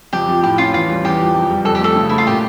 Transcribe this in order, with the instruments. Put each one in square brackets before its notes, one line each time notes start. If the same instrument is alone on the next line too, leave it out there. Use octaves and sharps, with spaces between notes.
[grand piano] F2 [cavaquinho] G4
[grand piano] F3
[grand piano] A2 [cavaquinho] G4
[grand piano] C#4 [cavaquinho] F4
[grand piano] E2 [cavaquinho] F4
[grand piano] G3
[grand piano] E2 [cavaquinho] G4
[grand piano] F3
F2
G3
[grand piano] F2 [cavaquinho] A4
[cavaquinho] G4
[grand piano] A3 [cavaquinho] A4
[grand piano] C#3
[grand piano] A3 [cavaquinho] E4
[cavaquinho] F4
[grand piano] A#2 [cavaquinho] G4